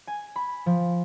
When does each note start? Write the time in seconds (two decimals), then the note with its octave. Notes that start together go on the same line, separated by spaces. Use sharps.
0.07 G#5
0.36 B5
0.66 F3